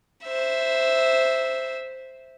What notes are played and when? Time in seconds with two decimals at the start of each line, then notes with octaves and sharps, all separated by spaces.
0.25 C5 E5